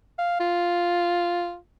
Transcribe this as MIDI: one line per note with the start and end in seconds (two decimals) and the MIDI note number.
0.19 0.40 77
0.40 1.56 65